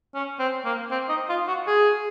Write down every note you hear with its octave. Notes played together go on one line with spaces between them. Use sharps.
C#4
C4
A#3
C4
D#4
F4
F#4
G#4